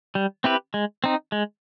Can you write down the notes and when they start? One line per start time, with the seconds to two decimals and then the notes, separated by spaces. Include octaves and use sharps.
0.15 G3
0.44 C4 E4 G4 B4
0.74 G#3
1.04 C4 D#4
1.32 G#3